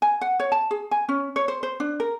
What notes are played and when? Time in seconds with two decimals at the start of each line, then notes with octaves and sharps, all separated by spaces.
0.02 G#5
0.21 F#5
0.40 C#5
0.52 A5
0.71 G#4
0.91 G#5
1.09 C#4
1.36 C#5
1.48 C5
1.63 C5
1.80 D4
2.00 A#4